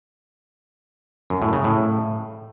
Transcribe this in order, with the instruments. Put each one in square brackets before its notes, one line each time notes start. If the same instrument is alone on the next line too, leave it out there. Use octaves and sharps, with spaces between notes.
[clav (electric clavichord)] F#2
A2
C#3
A2